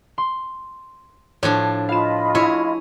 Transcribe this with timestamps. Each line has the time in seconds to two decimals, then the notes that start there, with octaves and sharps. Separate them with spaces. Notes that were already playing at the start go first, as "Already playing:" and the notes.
0.18 C6
1.43 A2 F3 D4 C#5
1.89 F4 D#5 F5 B5 E7
2.35 E4 G#4 C#5